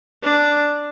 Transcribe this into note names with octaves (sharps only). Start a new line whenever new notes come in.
D4